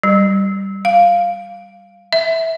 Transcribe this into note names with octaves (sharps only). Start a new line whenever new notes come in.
G3
F5
E5